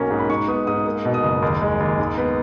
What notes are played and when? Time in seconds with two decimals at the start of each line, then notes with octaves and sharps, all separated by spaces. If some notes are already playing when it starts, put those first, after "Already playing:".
Already playing: B1 A#3 C#4
0.11 G#2
0.19 B5
0.29 G#2 C#6
0.48 B3 D#6
0.67 G#2 D#6
0.86 A#3 D#6
1.05 B2
1.14 D#6
1.24 F#1
1.42 D#2
1.62 G#3
1.80 D#2
1.99 G#2
2.18 B3